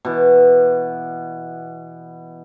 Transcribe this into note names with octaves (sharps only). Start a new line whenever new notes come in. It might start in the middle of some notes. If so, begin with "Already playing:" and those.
B2 E3